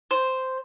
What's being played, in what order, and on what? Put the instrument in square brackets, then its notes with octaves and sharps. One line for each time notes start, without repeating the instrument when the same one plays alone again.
[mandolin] C5